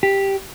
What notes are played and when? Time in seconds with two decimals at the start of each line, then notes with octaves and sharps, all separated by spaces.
0.03 G4